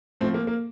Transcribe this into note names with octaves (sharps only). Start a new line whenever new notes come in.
A2 F3 A3 C4
A#3
A#3